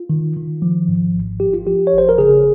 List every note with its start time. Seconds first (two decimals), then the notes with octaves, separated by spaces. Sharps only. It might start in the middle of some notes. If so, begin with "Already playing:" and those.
Already playing: F4
0.10 D#3
0.36 D#3
0.62 F3
0.88 G#2
1.14 G#1
1.40 F3 G4
1.53 F4
1.67 F3 G4
1.87 C#5
1.93 G#1
1.98 C5
2.09 A#4
2.18 C#3 G#4